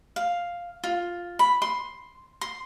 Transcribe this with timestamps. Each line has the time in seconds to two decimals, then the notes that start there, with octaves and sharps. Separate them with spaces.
0.16 F5
0.84 F4
1.39 B5
1.62 C6
2.41 C6